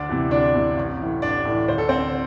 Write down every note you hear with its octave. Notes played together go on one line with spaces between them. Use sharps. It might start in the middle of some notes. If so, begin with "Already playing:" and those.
Already playing: D2 D4 D5
C3 E3
D2 D4 D5
C3 E3
A1
A2 E3
A1 D4 D5
A2 E3
D2 C5
A4
D3 C4 C5